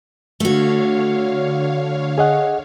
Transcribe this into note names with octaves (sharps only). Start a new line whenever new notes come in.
D3 A3 F#4 C#5 F5
G#4 D#5 F#5